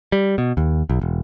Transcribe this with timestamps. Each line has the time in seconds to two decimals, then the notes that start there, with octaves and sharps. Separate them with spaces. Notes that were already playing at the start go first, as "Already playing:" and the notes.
0.12 G3
0.38 B2
0.57 D#2
0.89 B1
1.02 E1